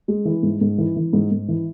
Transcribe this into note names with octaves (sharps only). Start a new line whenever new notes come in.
G#3
E3
G#2
G#2
E3
E3
G#2
G#2
E3